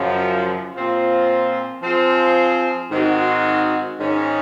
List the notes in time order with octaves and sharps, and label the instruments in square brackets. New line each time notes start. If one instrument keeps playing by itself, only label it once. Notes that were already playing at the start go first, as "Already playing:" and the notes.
Already playing: [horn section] F#2 C#3 F3
A#2 F3 C4 F4
F3 C4 F4 G#4
G#2 D#3 G#3 C4 F#4
G#2 D#3 G#3 C#4